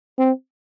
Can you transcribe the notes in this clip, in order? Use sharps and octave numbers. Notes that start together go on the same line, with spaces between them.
C4